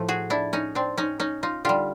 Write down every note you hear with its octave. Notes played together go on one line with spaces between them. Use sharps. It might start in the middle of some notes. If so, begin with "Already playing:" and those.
Already playing: A2 F3 A3
F#4 G#4
D4 E4
C#4 D#4
C4 D4
C#4 D#4
C#4 D#4
D#4 F4
D3 G3 F4 G4